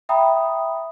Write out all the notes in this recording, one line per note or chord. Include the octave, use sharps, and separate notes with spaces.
E5 G5 A#5 B5 D#6